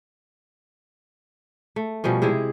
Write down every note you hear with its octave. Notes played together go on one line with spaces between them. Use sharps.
A3
B2 F3 G3 C#4
C3 G#3 E4 G#4